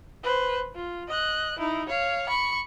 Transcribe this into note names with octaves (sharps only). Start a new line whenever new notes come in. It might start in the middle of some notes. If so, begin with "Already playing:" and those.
B4 C5
F4
D#5 F#6
D#4 E4
C#5 F5
B5 C#6